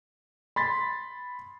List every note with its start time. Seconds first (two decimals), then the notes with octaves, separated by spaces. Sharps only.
0.56 B5 C6 A6 B6